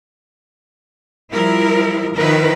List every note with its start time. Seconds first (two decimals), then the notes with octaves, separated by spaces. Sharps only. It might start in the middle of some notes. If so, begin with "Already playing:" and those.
1.32 F3 G3 E4 A#4
2.15 D#3 F3 E4 A#4 B4